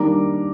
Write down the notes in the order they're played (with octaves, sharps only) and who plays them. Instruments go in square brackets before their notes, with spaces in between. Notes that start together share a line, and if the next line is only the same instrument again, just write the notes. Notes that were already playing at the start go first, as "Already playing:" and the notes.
Already playing: [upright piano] D#3 G3 A#3 D4 A#5 D6